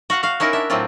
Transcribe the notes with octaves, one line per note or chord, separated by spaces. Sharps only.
F#4 F5 F#5
F#4 F5
C#4 D#4 E4 A#4
D4 E5
A2 F#3 C4 D4 F4